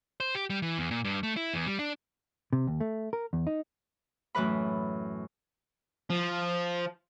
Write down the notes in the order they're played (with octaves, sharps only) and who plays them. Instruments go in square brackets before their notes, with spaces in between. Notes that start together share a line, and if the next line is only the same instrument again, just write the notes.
[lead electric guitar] C5
G4
G3
E3
E2
A#2
G2
A3
E4
E2
G3
D4
[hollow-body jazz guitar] C3
D#2
A3
A#4
E2
D#4
[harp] F#2 A2 E3 B4 B5
[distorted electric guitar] F3